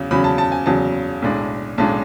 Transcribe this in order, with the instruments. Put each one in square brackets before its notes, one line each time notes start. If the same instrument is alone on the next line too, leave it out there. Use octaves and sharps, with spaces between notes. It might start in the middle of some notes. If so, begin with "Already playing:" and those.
Already playing: [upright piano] E2 C#3 F#3
E2 C#3 F#3 B5
A5
A5
G#5
E2 C#3 F#3 A5
B1 A2 G#3 D4
B1 A2 G#3 D4 A5